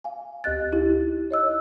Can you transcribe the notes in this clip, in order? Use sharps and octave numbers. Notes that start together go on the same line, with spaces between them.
F5 G#5
D2 G4 D#5 F#6 A6
D#4 E4 G4
C#5 D#5 E6 F#6